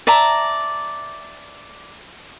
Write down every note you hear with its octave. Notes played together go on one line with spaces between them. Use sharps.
D5 E5 A5 A#5